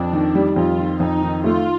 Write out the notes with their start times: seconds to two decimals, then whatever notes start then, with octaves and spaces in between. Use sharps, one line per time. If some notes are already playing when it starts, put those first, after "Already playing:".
Already playing: F2 D4
0.13 D#3
0.35 G3
0.56 F2 F4
0.79 D#3
1.00 F2 D#4
1.22 D#3
1.44 A3 F4